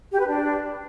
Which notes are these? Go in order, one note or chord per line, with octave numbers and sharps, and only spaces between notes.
G4
B4
D4